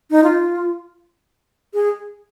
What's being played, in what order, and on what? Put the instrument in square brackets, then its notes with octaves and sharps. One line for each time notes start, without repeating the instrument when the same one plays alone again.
[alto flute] D#4
F4
G#4